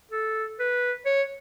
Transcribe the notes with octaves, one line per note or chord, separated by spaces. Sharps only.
A4
B4
C#5